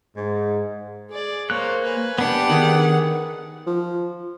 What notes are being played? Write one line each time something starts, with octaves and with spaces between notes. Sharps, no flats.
G#2
G#4 D5
A#3 C5 C#5 F#6
B4 G#5
B3 D4 G4 F#5
D#3 G#4
F3